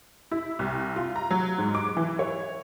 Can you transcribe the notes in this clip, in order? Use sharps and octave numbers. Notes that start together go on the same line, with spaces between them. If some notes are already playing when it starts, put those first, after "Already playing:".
E4
C2
F4
A#5
F#3
G#2
D6
E3
C#5